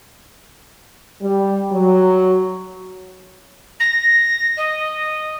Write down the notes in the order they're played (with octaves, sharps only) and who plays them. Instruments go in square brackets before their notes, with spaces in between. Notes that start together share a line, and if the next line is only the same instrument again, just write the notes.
[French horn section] G3
F#3
[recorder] A#6
D#5